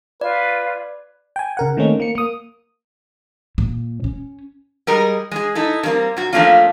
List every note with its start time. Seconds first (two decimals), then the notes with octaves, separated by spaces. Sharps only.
0.21 F4 B4 D5
1.36 G5 G#5
1.57 C#3 A#4 F#5
1.77 D#3 A3 A#3 C4 C#4 D#4
2.00 A#3 C#7
2.15 A#3 D#6
3.58 A#2
4.04 C#4
4.87 G3 G#3 A#4
5.31 G#3 G#4
5.55 D#4 E4 A4
5.83 D#3 G3 A#3 C4 A#4
6.17 F#2 F#4
6.33 F3 A3 A#3 C#4 D4 F4